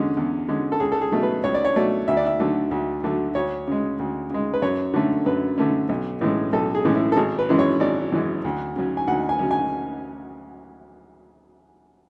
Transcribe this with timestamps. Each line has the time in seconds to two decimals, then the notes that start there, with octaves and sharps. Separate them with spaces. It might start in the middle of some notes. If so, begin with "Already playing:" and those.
Already playing: E2 D3 G#3 C#4
0.17 E2
0.48 D3 G#3 C#4
0.72 A4
0.80 C#2 G#4
0.92 A4
1.02 G#4
1.12 B2 F#3 A3
1.23 B4
1.44 C#2 C#5
1.54 D5
1.65 C#5
1.76 B2 F#3 A3 D5
2.08 D2 E5
2.17 D5
2.26 E5
2.40 D3 F#3 A3
2.71 D2
3.04 D3 F#3 A3
3.35 D2 C#5
3.67 C#3 G#3
3.99 D2
4.30 C#3 G#3
4.54 B4
4.62 F#2 C#5
4.94 D3 A3 C#4
5.26 F#2 B4
5.58 D3 A3 C#4
5.89 B1
6.21 A2 E3 G#3 C#4
6.53 B1 A4
6.75 G#4
6.85 A2 E3 G#3 C#4
6.95 E4
7.12 A4
7.17 G#1 G#4
7.39 B4
7.49 F#2 E3 G#3 C#4
7.59 C#5
7.80 G#1 D5
8.12 F#2 E3 G#3 C#4
8.45 D2
8.76 C#3 F#3 C#4
8.97 G#5
9.08 D2 F#5
9.29 G#5
9.39 C#3 F#3 C#4
9.51 G#5